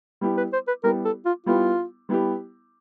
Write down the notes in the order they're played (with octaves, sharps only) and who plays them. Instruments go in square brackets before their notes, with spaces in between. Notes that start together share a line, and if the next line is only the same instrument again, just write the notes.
[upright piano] G3 B3 E4 G4
[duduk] B4
C5
B4
[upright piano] G3 B3 E4 G4 [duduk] A#4
[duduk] A4
F4
[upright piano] G3 B3 E4 G4 [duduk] F4
[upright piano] G3 B3 E4 G4